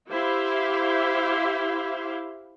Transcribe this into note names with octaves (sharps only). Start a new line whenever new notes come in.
E4 G4 C5 E5 F5